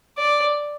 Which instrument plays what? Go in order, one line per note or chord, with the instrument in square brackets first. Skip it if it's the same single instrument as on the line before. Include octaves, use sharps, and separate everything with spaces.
[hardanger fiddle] D5